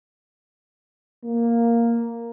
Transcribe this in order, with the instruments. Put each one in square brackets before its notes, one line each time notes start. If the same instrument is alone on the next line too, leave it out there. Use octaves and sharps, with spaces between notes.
[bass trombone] A#3